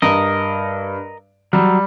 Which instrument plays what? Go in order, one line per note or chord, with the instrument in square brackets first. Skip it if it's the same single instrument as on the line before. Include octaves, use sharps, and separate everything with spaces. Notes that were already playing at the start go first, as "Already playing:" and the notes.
[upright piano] G2 [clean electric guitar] A#4 D#5
[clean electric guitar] F#3 [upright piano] G3